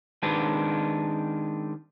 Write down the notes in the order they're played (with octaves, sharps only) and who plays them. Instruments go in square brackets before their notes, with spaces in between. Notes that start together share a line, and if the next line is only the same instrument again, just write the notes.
[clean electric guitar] D#3 G#3 C4 D4 B4